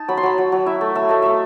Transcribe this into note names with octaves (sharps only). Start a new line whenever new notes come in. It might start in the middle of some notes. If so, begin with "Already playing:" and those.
Already playing: D#4 A5
F#3 B5
C6
F#3 B5
F#3
F#3
E4 E5
A3
A3 E5
A3 D#5
A3 E5